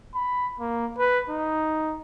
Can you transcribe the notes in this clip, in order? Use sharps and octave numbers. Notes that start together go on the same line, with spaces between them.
B5
A#3
B4
D#4